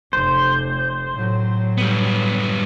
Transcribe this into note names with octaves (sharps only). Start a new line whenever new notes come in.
F1 C5
A2 F#3
G3 B3